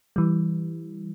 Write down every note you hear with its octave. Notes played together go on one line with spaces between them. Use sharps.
E3 G3